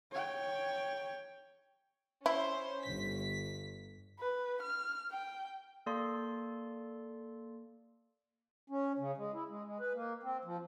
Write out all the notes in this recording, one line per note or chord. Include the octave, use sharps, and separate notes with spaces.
C#5 G5
C#4 E4 C5
G1 B6
B4
F6
G5
A#3 A4 D5 C6
C#4
C#3
G#3
E4
G#3
G#3
B4
A#3
C4
F3